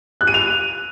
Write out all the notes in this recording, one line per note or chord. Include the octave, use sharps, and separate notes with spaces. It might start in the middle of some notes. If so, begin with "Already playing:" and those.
F#6
D#7
F7